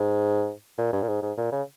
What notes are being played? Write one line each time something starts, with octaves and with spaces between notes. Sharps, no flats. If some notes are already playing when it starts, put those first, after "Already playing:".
Already playing: G#2
A#2
G2
A#2
G#2
G#2
A#2
C#3